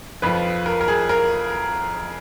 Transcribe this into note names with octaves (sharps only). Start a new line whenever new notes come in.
F2 F3 B4
A#4
A#4
G#4
A#4